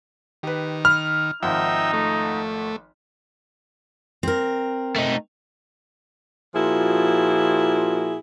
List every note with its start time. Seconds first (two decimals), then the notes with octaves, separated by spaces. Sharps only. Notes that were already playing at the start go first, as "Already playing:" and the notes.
0.43 D#3 G4 B4
0.85 B5 F6
1.43 G#1 F3 D#4 E5 F#5 G5
1.93 A3
4.23 C4 A#4
4.96 A3 D#4
6.55 A#2 F3 E4 F#4 G#4